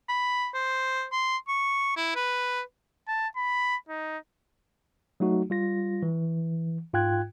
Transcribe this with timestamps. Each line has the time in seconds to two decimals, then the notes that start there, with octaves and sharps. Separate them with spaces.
0.09 B5
0.54 C5
1.12 C6
1.48 C#6
1.97 E4
2.15 B4
3.08 A5
3.37 B5
3.89 D#4
5.20 F#3 A3 D#4 F#4
5.50 G3 F4 A#6
6.03 E3
6.93 G#2 F4 G5 F#6 G#6